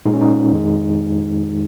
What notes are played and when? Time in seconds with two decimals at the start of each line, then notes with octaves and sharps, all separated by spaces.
0.06 A#2 G#3 D#4
0.14 C#4
0.21 D#4
0.51 F2 D#3 G#3